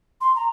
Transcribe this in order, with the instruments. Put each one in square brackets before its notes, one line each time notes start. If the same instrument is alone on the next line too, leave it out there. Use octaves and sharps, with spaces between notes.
[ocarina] C6
A#5